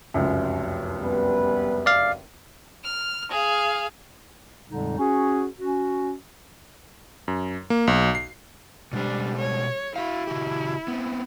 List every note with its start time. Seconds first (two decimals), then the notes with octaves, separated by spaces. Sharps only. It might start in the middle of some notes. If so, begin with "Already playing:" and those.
0.14 F1 C#2 F#2
1.01 G3 B3 B4
1.86 D5 F5
2.84 F6
3.30 G#4 F5
4.68 F2 A#2 D3 G3 G#3 D#4
4.98 C#4 F#4 G#4
5.59 C#4 F#4
7.28 F#2
7.70 A#3
7.87 B1
8.15 C7
8.93 B2 G3 G#3 D4 C5
9.37 C#5
9.96 E4 F#4 F5
10.27 C#3 F#4 G4
10.88 B3 C4